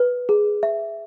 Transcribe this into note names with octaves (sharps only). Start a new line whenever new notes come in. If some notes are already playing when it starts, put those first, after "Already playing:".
Already playing: B4
G#4
E5